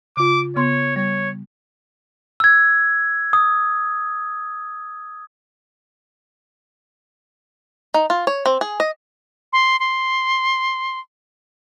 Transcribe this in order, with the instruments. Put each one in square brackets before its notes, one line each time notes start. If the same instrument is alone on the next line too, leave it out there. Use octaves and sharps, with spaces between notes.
[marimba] C#3 F4 [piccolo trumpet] D6
[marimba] C#3 B3 C6 [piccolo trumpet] C#5
[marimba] G3 [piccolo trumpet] C#5
[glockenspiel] E6 G#6
D#6
[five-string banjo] D#4
F4
C#5
C4
G#4
D#5
[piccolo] C6
C6